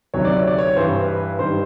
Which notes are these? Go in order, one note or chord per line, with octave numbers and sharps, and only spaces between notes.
D2 C3 D#3 F#3 C#5
D5
C#5
D5
C#5
G2 E3 G3 C5
B4
G2 D#3 G3 C5